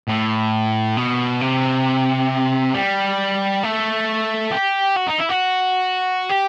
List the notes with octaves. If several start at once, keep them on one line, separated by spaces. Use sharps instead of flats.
A2
B2
C3
G3
A3
G4
F#4
D#4
E4
F#4
G4